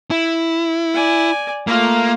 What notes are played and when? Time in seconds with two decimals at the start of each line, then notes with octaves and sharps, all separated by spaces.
0.11 E4
0.94 D5 G#5
1.67 A3 A#3 F4